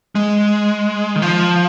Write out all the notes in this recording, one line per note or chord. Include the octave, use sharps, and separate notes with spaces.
G#3
D#3
F3